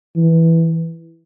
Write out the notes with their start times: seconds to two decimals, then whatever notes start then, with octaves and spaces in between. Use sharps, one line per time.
0.16 E3